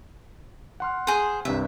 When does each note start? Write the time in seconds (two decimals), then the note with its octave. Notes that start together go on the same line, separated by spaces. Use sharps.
0.80 F#5 C6 F6
1.07 G#4 C5
1.45 C2 G2 C3 E5